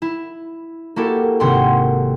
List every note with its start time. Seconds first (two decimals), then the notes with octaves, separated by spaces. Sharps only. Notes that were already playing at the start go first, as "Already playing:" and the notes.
0.02 E4
0.96 A#3 E4 F#4 G4 A4
1.40 G#1 C3 C4 F#5 G5 C6